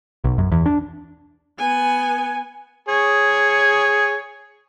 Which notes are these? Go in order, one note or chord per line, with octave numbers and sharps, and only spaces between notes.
B1
F#2
E2
D4
B3 G#5
G#4 C#5